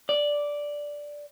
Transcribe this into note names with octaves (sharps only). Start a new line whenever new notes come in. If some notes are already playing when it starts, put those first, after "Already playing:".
D5